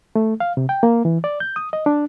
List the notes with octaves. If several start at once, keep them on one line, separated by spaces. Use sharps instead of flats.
A3
F5
C3
G5
A#3
E3
D5
G6
D#6
D#5
D4